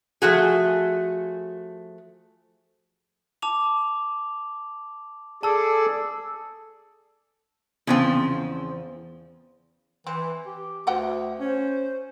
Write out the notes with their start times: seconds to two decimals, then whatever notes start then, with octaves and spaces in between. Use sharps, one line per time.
0.22 F3 A3 F#4 G#4
3.42 A5 D6 F7
5.43 G#4 A4 D5 A5 E6
7.87 E2 C#3 F3 C4
10.07 E3 C4
10.46 G4
10.87 D2 F3 F#5 G5
11.40 C#4 C5